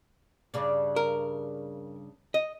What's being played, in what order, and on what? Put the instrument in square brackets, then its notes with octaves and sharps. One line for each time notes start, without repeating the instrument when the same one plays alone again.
[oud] G2 C#3 D4
[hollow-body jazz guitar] A#4
D#5